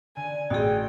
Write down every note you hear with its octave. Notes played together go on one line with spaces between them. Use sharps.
D3 G#5
A1 F#4 G#4 G5